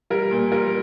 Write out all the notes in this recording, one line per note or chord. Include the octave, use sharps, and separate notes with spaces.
G3 A#4
A#2
G3 A#4